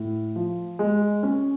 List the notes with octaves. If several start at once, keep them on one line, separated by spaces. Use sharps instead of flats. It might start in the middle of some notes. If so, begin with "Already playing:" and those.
Already playing: A2
F3
G#3
C#4